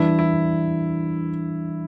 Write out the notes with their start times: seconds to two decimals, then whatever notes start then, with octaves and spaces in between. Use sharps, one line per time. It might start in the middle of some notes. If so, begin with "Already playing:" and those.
Already playing: E3 G3 D4 E4
0.19 E4